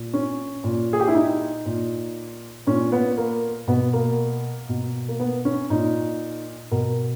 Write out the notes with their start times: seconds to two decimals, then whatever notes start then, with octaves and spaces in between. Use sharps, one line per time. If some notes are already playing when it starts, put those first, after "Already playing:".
Already playing: A#2
0.14 C#4
0.64 A#2
0.93 G#4
1.00 G4
1.08 E4
1.15 D#4
1.66 A#2
2.67 A#2 C#4
2.92 B3
3.18 A#3
3.68 B2 B3
3.93 A#3
4.69 B2
5.08 A#3
5.20 B3
5.45 C#4
5.70 A#2 D#4
6.72 B2 A#4